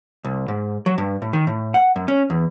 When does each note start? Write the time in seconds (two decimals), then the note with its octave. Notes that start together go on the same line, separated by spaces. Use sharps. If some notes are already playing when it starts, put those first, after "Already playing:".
0.24 C2
0.48 G#2
0.86 F#3
0.98 G2
1.22 A2
1.33 D#3
1.47 A2
1.74 F#5
1.96 F#2
2.08 C#4
2.30 E2